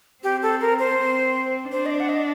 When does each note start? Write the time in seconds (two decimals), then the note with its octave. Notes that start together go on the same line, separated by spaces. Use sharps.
0.24 C4 G4
0.42 A4
0.61 A#4
0.79 C5
0.97 C4
1.72 D4 C5
1.86 D#5
1.91 D5
2.00 F#5
2.09 D#5